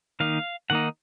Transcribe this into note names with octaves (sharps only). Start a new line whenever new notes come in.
D#3 A#3 D#4 F5
D#3 A#3 D#4 F#5